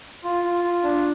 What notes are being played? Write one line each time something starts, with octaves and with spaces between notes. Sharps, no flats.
F4
F4
F4
D4